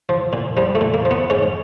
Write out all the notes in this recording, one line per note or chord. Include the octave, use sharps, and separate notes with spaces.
F3
A#2
F3 G3
A3
A#2
A#3
F3
B3
G#2 C#4